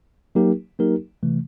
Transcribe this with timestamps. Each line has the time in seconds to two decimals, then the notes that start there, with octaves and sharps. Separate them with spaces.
0.35 F#3 A#3 D#4 G4 A#4
0.79 F#3 A#3 D#4 G4 A#4
1.23 C3 E3 A3